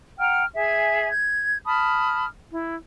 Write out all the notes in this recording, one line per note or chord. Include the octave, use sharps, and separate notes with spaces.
F#5 G5 A#5 F6
G#4 E5 G#5
G6 G#6
A5 B5 D#6 F6
E4